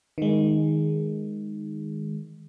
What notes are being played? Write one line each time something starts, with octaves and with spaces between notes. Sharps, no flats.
D#3 G#3